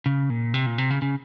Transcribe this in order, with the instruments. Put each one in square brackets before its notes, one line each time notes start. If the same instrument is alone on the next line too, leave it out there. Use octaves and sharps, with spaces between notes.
[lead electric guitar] C#3
A#2
C3
A#2
C3
C#3
C#3